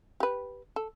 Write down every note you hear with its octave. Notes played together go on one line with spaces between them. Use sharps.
G4 B4
A4